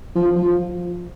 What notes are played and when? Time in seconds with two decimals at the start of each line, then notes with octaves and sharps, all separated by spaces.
0.16 F3
0.36 F3